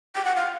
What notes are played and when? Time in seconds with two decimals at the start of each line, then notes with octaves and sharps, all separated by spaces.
0.15 G5
0.25 F#5
0.36 F5